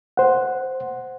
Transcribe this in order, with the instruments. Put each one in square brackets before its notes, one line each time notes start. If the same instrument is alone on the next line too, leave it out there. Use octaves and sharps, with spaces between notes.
[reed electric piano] C5 F#5